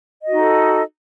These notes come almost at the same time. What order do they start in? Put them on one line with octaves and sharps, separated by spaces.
D#5 F#4 D#4 A4